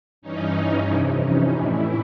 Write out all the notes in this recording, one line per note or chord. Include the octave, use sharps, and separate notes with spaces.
G2 E3 C#4 D#4
F2 C3 E3 D4 E4
C#4 D#4
A2 E3 D4 E4